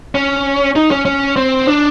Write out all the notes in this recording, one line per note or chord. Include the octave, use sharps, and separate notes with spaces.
C#4
D#4
C#4
C#4
C4
D4